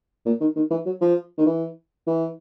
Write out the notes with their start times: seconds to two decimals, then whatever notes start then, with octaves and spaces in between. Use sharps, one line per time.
0.26 A#2
0.40 D#3
0.56 D#3
0.71 E3
0.86 F#3
1.01 F3
1.38 D#3
1.46 E3
2.07 E3